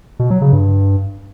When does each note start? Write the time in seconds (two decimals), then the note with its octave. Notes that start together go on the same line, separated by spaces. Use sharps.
0.19 B2
0.30 F#3
0.41 C#3
0.53 G2